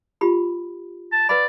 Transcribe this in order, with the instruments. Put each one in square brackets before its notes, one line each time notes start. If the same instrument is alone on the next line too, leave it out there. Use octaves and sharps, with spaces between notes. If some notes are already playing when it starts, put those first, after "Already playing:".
[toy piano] F4 G4 B5
[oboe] A5
[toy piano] B4 F5 B5 [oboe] D5